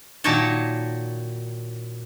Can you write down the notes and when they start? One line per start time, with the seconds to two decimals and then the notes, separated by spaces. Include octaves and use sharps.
0.24 A#2 D#3 F#3 D#4 C#5 A5